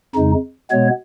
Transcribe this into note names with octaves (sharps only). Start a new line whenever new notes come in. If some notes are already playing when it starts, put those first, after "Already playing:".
F2 C#3 G#3 D#4
B2 G#3 B3 C#5